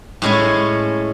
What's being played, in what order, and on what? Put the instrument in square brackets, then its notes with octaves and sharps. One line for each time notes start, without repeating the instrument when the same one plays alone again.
[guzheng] A2 G#3 C#4 C#5